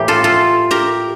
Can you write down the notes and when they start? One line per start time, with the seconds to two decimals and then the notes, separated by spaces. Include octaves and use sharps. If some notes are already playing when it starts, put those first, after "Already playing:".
Already playing: A2 E3 A#3 G4
0.08 F4 A4
0.24 F4 A4
0.71 G4 A#4